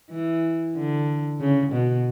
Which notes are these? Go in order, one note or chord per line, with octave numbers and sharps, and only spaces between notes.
E3
D3
C#3
B2